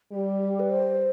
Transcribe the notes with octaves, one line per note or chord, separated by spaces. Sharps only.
G3 G4
B4
C5